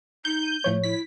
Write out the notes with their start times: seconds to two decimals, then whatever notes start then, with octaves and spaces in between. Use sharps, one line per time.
0.25 D#4 G6
0.43 D#7
0.64 A2 F3 A3 C#5
0.84 E4 B6